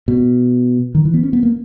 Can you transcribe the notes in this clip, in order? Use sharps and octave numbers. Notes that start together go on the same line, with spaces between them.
B2
D#3
E3
B3
C#4
B3
A#3